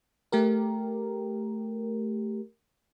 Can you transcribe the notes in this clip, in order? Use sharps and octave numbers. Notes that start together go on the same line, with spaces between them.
A3 G4 A#4